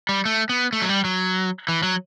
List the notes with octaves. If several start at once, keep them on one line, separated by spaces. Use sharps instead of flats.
G3
A3
B3
A3
F#3
G3
F#3
E3
F#3